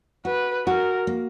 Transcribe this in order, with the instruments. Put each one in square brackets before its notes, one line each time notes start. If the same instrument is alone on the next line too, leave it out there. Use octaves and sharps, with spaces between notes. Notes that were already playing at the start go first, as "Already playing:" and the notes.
[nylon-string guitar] F#4 [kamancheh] B4
[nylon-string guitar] F#4 [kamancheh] A#4
[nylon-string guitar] A#3